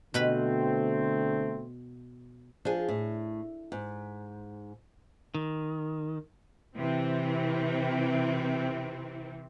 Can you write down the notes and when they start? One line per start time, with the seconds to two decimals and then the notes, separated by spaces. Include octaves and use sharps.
0.14 B2 D3 A3 C4 B4 B5
2.65 F3 D4 G#4
2.89 A2
3.72 G#2
5.35 D#3
6.77 C3 E3 C4